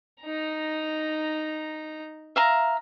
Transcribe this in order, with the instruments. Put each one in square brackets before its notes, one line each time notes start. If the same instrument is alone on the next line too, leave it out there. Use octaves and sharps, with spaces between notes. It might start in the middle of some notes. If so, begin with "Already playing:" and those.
[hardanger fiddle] D#4 A#5
[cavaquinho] E5 F5 A#5